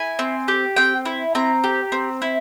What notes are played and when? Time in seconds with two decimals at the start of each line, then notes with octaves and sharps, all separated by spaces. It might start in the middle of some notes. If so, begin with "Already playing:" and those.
Already playing: E4 G#5
0.19 C4
0.48 G4
0.76 C4 G5
1.05 E4
1.35 C4 A#5
1.64 G4
1.92 C4
2.22 E4